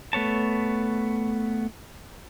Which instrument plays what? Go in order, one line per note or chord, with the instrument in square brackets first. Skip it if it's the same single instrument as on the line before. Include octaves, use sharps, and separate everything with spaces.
[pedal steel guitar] A3 B3 C#5 A5